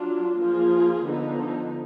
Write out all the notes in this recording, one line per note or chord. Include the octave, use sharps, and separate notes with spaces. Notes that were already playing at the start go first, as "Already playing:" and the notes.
Already playing: F#3 D4 F4
F3 A#3 F4 G#4
D3 F3 B3 D#4